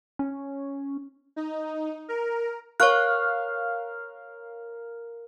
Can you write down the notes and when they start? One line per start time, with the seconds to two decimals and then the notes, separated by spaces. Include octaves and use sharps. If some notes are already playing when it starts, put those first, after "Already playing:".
0.19 C#4
1.36 D#4
2.08 A#4
2.80 A#4 C#5 F5 C#6 F#6